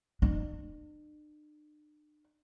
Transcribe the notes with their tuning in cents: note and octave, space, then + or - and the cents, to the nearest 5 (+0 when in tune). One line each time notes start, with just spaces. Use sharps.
D4 +45